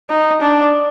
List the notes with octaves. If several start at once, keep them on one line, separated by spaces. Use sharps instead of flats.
D#4
D4